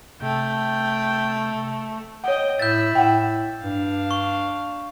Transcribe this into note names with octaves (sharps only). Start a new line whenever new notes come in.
C3 A3 G5
C#5 D#5 F#5 G5
A2 E5 B5 G6 A6
A2 F#5 G5
G2 D4 F5
C#6